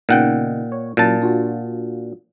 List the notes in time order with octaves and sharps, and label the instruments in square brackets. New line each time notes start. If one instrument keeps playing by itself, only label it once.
[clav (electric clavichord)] A#2 F#5 G5 [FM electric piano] C#3 B3 D#4
[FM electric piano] C#5
[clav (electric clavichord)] A#2 A5 [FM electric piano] F#3 C#4 E4
[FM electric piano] D4 F4 F#4